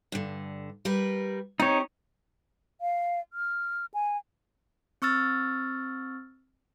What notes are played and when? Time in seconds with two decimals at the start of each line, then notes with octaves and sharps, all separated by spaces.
0.12 G2 D3
0.85 G3 A#4 B4
1.60 C4 D#4 G4 C#5
2.81 F5
3.33 F6
3.94 G#5
5.02 C4 C#6 E6 F6 A6